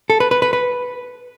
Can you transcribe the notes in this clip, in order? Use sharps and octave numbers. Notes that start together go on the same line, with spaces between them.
A4
B4
B4
B4
B4